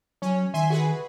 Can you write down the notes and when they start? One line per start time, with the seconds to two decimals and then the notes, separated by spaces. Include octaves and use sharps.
0.22 F#3 C#4
0.54 D#3 E5 G#5 C6
0.70 F#4 G#4 B4